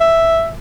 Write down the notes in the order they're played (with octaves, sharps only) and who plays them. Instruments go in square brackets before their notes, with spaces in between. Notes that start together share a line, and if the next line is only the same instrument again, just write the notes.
[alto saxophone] E5